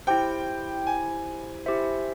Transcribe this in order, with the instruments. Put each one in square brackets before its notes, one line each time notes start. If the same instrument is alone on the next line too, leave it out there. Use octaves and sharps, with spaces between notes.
[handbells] E4 G4 C5 [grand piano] G5
[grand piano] G#5
[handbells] E4 G4 C5 E5